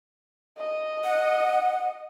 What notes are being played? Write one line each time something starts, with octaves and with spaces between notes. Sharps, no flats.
D#5
F#5